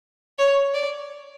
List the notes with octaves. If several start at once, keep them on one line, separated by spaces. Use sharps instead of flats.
C#5
D5